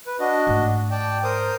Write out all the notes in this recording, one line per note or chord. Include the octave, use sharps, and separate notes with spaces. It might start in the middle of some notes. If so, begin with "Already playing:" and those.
B4
D4 F#4 D#5
G#2 A3
D5 G5 A5
A#4 C5 D#6